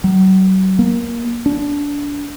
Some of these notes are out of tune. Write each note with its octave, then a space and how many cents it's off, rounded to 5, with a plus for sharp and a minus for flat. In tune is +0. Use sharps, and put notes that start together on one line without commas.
F#3 +40
A#3 +20
D4 -25